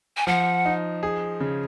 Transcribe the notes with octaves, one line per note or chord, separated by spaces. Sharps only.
G#5
F3 F#5
D#4
G#4
C#3